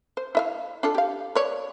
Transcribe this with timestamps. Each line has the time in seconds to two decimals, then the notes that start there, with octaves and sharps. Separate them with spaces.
0.17 C5
0.35 E4 E5 F5
0.83 D4 F4 A4
0.95 G4 F5
1.35 B4 C#5 D5